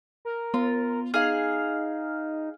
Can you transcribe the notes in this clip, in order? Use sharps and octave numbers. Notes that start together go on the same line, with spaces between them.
A#4
B3 F4
D#4 G#4 F5 F6